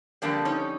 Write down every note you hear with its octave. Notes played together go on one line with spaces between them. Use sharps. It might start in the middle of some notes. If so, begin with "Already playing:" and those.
F2 D3 G3 A#3 D4
C#4 D#4